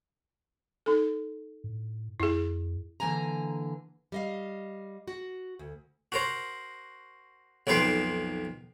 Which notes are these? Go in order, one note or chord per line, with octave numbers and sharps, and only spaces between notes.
D#4 A4
A2
F2 E4 G#4
D3 E3 A#3 G#5 A#5
G3 D#5 F5
F#4
D2
F#4 A#4 C5
B1 F2 D#3 B4 G5 C6